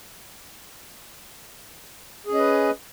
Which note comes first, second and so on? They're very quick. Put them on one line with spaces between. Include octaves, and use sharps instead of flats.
G#4 C#4 D#5 B4